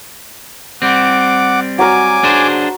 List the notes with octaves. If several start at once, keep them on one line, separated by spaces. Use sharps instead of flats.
G3 C4 F#5 D6
F#3 A#4 G#5 D6
D4 G#4 C5